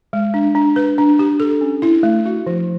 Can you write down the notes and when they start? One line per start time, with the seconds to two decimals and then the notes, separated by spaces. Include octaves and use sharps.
0.13 G#3
0.34 D4
0.55 D4
0.76 B4
0.98 D4
1.19 G4
1.40 A4
1.61 C#4
1.82 E4
2.03 A3
2.26 F#4
2.47 F3